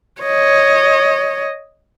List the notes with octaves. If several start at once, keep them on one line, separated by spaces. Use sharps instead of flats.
C#5 D#5